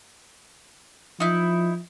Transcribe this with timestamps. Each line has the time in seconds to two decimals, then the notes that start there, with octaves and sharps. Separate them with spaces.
1.20 F3 D#4 E4